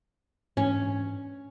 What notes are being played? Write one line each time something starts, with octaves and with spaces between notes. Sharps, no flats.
G#2 E3 C#4 D4